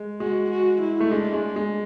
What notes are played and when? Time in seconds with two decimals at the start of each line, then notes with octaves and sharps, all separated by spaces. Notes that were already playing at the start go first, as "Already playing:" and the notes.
Already playing: G#3
0.20 G#3 F#4
0.50 F#4
0.82 E4
1.00 A3
1.11 G#3 D4
1.33 G#3
1.56 G#3